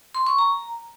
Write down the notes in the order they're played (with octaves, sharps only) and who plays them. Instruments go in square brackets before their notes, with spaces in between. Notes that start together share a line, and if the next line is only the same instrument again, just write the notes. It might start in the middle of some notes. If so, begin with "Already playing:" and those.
[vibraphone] C6
C#6
A#5